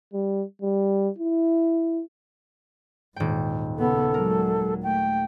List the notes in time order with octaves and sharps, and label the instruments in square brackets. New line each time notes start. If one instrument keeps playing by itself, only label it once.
[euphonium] G3
G3
E4
[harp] D#1 G5 [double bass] G#2
[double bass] C#3 B3 [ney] A4
[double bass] F#3 G#3 [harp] A#4
[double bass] A3 [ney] G5